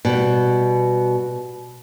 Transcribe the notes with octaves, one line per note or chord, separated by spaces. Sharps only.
B2 G3